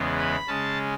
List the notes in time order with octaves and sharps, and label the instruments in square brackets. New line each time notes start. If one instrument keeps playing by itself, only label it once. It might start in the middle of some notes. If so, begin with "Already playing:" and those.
Already playing: [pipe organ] E2 C#3 E3 G#3 B3
B5
C#3 G#3 C#4 A5